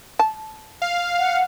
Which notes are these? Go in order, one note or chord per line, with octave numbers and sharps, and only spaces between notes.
A5
F5
F#5